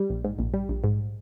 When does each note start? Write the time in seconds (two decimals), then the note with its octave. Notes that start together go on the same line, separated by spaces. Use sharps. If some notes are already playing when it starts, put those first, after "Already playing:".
Already playing: G3
0.10 A#1
0.24 G#2
0.39 A#1
0.54 G3
0.69 A#1
0.84 G#2